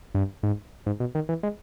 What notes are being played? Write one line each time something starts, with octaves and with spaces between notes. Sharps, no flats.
G2
G#2
G#2
B2
D#3
E3
G#3